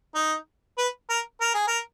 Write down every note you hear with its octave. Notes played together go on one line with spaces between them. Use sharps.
D#4
B4
A#4
A#4
G#4
A#4